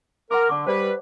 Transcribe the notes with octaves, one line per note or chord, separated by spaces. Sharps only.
A#4 F#5 C6 D6
D3 A5 C#6 D6
G3 B4 C5 D5